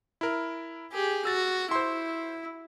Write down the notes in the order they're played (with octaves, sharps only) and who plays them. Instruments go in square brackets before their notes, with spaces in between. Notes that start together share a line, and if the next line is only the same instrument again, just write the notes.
[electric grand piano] E4 A#4
[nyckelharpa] G4 G#4
[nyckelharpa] F#4 [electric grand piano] E6 A6
[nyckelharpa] E4 [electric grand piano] C5 C6